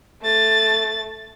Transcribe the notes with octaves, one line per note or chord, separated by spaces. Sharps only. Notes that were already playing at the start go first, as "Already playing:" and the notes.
A3 A6